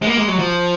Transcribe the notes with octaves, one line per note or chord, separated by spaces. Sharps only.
G#3
A#3
G#3
F#3
F3